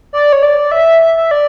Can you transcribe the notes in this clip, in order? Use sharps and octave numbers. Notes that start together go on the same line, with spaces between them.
D5
C#5
D5
E5
E5
E5
D5